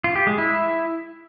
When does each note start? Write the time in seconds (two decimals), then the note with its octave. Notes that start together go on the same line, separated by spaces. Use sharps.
0.04 F4
0.16 G4
0.27 G#3
0.38 E4